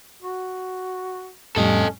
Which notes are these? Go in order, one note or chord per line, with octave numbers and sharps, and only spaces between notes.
F#4
F2 A2 G3 C#4 A4 D#5